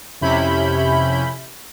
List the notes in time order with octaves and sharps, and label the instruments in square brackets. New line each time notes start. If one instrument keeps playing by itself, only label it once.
[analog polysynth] F2 C3 C#4 E4 B5 G6